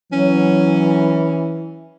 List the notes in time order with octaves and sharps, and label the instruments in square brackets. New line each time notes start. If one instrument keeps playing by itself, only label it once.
[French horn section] E3 [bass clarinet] F#3 [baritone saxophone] C#4